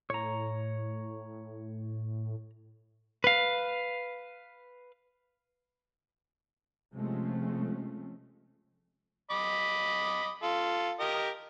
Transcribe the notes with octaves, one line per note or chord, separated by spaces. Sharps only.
A2 C#5 A#5
B4 F5
C3 F3 G#3 A3 C4 C#4
D#5 B5 D6
F4 A4
G4 A#4 D#5